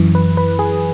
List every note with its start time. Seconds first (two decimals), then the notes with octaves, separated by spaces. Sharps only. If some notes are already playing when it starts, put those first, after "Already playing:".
Already playing: F#2 E3
0.15 B4
0.37 B4
0.59 G#4